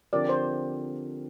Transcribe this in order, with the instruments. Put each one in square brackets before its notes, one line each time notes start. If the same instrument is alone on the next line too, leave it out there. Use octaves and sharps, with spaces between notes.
[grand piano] D3 F3 C4 G4 A#4 [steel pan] D5
[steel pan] C5